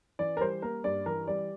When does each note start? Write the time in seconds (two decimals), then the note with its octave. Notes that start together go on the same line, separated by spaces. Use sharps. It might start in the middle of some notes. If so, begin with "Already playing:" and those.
0.19 E3 D5
0.37 A#4
0.41 G3 C5
0.62 A#3 A#4
0.84 G2 D5
1.06 E3 A#4
1.28 G3 D5